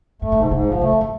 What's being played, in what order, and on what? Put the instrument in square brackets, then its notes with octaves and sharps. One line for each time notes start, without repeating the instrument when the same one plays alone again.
[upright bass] G#2 [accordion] A3
[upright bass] A2
[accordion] G#2 [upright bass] B2
[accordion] G#2 [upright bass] B2
[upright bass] A#2
[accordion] F3
[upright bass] A#2
[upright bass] C3 [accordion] A3
[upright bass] E3
F3